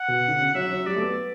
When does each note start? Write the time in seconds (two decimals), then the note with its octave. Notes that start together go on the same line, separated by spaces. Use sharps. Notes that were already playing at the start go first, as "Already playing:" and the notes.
Already playing: F#5
0.08 B2
0.28 D3
0.39 C#3
0.54 F#3 E5
0.71 F#3
0.86 G3 D5
0.96 A3
1.02 B3